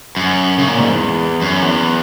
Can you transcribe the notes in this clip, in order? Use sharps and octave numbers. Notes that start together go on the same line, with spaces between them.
F#2
C#3
A#2
G#2
E2
F#2
E2